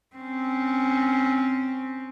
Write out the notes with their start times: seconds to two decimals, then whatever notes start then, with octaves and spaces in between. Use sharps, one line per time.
0.16 C4 C#4